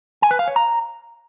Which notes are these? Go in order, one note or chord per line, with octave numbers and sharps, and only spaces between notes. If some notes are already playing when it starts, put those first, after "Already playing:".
G#5
B4
F5
C#5
A#5